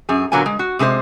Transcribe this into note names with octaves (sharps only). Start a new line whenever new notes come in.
F#2 G#4
A#2 D3 F#3 A#3 B3 G#5
G#3
F#4
C3 G#3 G4 C5 D5